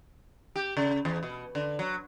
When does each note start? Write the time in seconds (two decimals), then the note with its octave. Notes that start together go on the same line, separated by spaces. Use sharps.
0.56 G4
0.77 C#3
1.05 E2
1.23 B2
1.55 D3
1.79 F#3